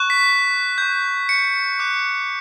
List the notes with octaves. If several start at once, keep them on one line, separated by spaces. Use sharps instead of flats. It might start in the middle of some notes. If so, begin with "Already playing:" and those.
Already playing: C#6 F#6
B6
C#6 G6
C#7
D6 F#6